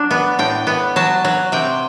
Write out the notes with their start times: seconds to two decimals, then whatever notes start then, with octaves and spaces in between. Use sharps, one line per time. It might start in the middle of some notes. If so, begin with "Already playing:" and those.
Already playing: F#3 D4
0.11 B3
0.39 A2 G5
0.67 B3
0.96 F#3 A5
1.25 F#3
1.52 C3 G5